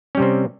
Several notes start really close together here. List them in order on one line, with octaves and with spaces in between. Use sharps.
C#4 G3 C3 C4